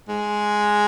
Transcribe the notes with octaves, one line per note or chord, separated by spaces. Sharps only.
G#3